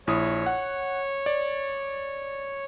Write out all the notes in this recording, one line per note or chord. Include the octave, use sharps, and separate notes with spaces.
A#1 E4 C#5 D#6
F#5
D5